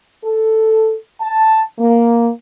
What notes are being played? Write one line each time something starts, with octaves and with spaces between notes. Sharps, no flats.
A4
A5
A#3